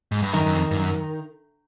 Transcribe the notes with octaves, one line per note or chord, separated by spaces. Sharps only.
G#2
G2
F#2 D#3
F#2
F2
G2
F#2